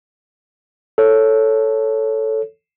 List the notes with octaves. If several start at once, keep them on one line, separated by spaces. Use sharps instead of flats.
A4 C#5